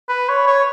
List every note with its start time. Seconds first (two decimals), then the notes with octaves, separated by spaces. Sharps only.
0.09 B4
0.29 C#5
0.47 C#5